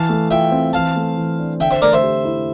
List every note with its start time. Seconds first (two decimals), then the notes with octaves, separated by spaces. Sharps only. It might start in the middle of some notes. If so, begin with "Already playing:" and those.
Already playing: E3 F5 A5
0.09 A3
0.31 F4 E5 G5
0.52 C4
0.73 E3 F5 A5
0.96 A3
1.17 E3
1.39 D4
1.60 D3 E5 G5
1.71 C5 E5
1.82 A3 A#4 D5
1.93 C5 E5
2.03 G4
2.25 E4